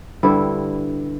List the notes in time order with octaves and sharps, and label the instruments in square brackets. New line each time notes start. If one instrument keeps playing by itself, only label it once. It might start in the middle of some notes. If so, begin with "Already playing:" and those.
[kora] G2 D3 G3 E4